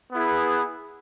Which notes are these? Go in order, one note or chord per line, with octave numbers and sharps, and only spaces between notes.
B3 E4 G#4 B4